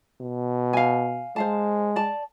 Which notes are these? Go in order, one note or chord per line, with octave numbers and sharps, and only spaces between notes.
B2
F5 G#5
G#3 C5 F5 A5
D5 A5